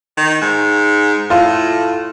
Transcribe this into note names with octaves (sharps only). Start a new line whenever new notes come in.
D#3
G#2
A2 F4